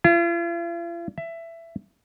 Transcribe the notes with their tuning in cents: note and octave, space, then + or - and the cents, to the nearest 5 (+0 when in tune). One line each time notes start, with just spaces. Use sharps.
F4 -45
E5 +15